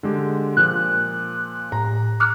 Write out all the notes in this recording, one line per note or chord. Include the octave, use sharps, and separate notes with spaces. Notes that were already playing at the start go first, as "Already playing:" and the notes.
D3 G#3 G4
A#2 F3 F#6
A2 A#5
D6 F6 F#6